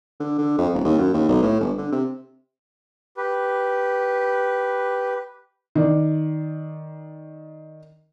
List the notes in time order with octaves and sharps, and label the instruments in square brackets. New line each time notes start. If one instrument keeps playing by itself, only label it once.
[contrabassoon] D3
D3
F2
D#1
D#2
F#2
D#2
B1
A2
G1
D3
C3
[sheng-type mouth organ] G4 B4
[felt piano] D#3 D5